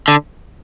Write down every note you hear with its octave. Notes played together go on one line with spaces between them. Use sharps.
D3